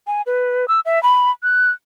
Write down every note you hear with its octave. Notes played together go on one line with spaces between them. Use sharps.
G#5
B4
E6
E5
B5
F#6